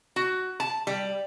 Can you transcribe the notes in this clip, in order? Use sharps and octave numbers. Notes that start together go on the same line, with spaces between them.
F#4
A5
G3